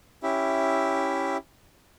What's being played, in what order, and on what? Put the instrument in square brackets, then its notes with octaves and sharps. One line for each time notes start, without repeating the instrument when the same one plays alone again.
[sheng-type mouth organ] C#4 E4 G4 E5